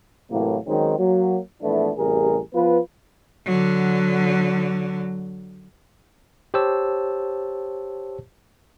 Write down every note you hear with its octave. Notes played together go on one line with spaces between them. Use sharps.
A2 C3 E3 F#3 A#3
D#3 F#3 G#3 C4 C#4 D#4
F#3 A#3
A#1 E3 A3 B3 D4 E4
A1 C3 G3 G#4 A#4
F3 B3 F4 B4
D3 F#3
G4 C5 C#5 A5 E6